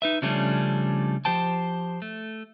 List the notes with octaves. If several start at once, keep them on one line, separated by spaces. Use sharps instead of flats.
D#4 B4 E5
C#3 F3 G3 A3 C#4 D4
F3 G4 C5 G5 A5
A3